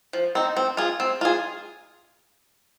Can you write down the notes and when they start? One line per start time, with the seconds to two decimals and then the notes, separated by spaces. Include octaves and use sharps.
0.13 F3
0.35 C4 D#4
0.57 C4
0.77 F4 G#4
1.00 C4
1.21 F4 G#4